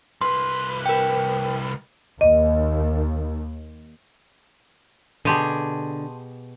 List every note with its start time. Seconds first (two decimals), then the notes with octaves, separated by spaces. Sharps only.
0.21 C2 B4 C6
0.86 A#4 G5
2.21 D#2 D#5
5.25 B2 D3 G4 G#4 A5 C6 D#7